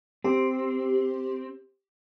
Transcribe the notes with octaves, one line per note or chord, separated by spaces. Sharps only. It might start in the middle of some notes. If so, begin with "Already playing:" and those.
C4 G4